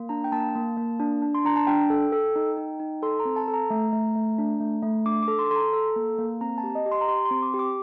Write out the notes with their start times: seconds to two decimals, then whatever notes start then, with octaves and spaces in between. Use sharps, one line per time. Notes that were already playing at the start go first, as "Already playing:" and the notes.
Already playing: A#3
0.09 D4 A#5
0.24 G5
0.32 A#3 A5
0.55 A#3
0.77 A#3
1.00 D4
1.22 D4
1.35 C6
1.45 D4 A#5
1.56 A5
1.67 D4 G5
1.90 A4
2.12 A4
2.36 D#4
2.57 D#4
2.80 D#4
3.02 A4 C6
3.19 A#5
3.25 C4
3.36 A5
3.48 A4
3.54 A#5
3.70 A3
3.93 A3
4.15 A3
4.38 D4
4.60 A3
4.83 A3
5.06 D4 D6
5.23 D6
5.28 A4
5.39 C6
5.51 A4 A#5 C6
5.73 A4
5.96 A#3
6.18 A#3
6.41 C4 A#5
6.58 A5
6.64 G4
6.75 D#5
6.86 G4
6.92 C6
7.01 A#5
7.08 G4 C6
7.25 C6
7.31 C4
7.42 D6
7.54 G4
7.59 D6